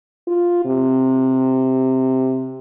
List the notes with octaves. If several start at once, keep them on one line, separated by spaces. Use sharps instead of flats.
F4
C3